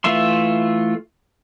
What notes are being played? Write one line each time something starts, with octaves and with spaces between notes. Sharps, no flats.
E3 A3 F4 E5 C6